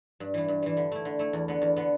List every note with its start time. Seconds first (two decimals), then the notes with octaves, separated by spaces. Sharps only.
0.20 G2
0.34 E3 G3
0.48 G2
0.63 E3 G3
0.77 D3
0.92 A3 E4
1.05 D3
1.19 A3 E4
1.33 E2
1.48 D3 B3
1.62 E2
1.76 D3 B3